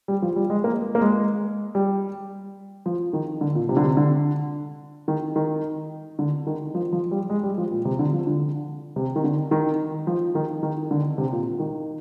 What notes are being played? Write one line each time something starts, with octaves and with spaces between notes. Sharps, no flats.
G3
F3
G3
G#3
A#3
A#3
G#3
G3
F3
D#3
D3
A#2
C3
D3
C3
D3
D#3
D#3
D3
D#3
F3
F3
G3
G#3
G3
F3
A#2
C3
D3
F3
D3
C3
D#3
D3
D#3
F3
D#3
D#3
D3
C3
A#2
D#3